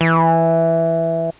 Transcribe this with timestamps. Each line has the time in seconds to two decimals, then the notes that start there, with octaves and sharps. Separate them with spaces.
0.01 E3